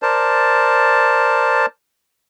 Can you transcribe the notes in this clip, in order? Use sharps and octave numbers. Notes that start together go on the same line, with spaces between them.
A#4 C5 D5 A5